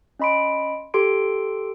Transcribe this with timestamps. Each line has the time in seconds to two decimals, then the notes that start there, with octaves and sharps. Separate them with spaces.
0.19 C#4 D#5 B5 C6 D7
0.94 G4 A4 C6 D7